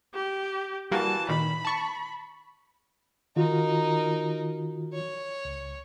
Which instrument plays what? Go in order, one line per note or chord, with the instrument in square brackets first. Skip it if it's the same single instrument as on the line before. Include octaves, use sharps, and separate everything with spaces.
[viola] G4
[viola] E3 A5 [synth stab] G3 A#3 F#4
[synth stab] A#2 D#3 [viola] B5
[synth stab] A5 C#6
[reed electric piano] D#3 F4 F#4 [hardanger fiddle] D#4 A#4
[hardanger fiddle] C#5
[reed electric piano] C#2